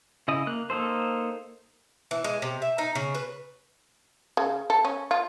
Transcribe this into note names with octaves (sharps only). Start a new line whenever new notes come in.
C#3 E4 D#5
A#3 F#6
A#3 D#4 A4 C5
E3
G#3
C3
E5
D#4
C#3
B4
C#3
A4
C#4
F4